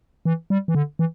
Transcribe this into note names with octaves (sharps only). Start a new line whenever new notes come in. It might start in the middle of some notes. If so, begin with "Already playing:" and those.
E3
G3
E3
D3
E3